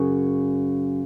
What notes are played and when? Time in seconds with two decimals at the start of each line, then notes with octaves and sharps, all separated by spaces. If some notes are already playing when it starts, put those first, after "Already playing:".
Already playing: F#2 C#3